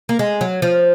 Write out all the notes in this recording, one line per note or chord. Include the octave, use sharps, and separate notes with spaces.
A#3
G#3
F#3
F3